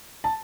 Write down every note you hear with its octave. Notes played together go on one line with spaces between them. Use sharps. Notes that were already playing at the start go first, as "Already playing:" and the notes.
A5